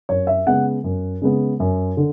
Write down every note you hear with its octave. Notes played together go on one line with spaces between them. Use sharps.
F#2 C#5
E5
C#3 G#3 B3 F#5
F#2
C#3 G#3 B3
F#2
D3